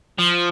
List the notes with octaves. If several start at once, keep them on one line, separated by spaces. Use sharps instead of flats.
F3